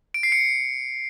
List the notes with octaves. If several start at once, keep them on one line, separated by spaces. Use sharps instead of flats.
D7
C7
C#7